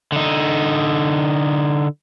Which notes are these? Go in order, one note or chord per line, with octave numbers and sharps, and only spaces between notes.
D3 D#4